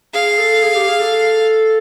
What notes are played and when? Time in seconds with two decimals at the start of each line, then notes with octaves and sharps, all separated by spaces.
0.14 G#4 F5
0.39 A4
0.63 G#4
0.75 G4
0.88 G#4
1.00 A4